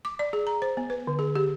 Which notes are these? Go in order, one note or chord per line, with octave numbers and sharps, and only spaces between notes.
D6
D5
G#4
A#5
C5
B3
B4
D3
G#4
G4